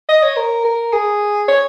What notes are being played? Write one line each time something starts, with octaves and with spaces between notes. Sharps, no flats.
D#5
C#5
A#4
A#4
G#4
C#5